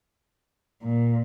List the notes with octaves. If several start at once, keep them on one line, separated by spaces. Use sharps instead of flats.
A#2